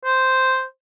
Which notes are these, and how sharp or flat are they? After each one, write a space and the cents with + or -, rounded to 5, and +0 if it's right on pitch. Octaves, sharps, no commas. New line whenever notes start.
C5 -5